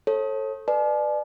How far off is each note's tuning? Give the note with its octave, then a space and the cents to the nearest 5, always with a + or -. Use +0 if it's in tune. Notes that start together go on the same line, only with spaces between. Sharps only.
A4 +0 C#5 -35
B4 +0 D5 +25 G#5 +45